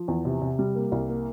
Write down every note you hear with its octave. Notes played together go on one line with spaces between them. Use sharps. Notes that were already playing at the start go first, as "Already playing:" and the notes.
Already playing: F3
E2
C3
C3
G3
A#3
C2
A#3